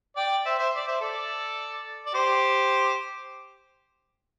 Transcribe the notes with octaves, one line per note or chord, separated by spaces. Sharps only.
D5 G5
C5 E5
C5 E5
D5
C5 E5
A4 D5
D5
G4 C5